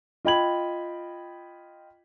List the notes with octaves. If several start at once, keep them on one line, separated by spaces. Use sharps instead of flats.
F4 D#5 G5 B5 G#6 F#7